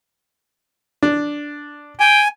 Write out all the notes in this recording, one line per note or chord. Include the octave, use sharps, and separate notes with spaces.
D4
G5 G#5